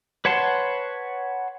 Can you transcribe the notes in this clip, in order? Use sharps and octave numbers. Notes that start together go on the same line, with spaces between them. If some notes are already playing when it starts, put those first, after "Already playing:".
B4 C#5 F#5 A5 C6